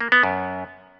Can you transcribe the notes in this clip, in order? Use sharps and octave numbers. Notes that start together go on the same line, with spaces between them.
A#3
B3
F#2